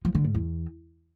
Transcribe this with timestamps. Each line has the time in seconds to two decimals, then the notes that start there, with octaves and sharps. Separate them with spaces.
0.05 F3
0.15 D3
0.25 G#2
0.34 E2